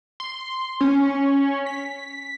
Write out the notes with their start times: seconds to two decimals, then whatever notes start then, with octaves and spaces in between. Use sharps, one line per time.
0.20 C6
0.81 C#4
1.66 B6